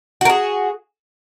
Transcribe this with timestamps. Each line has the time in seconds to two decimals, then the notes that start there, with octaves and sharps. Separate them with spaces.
0.21 F#4
0.25 A#4
0.30 G#4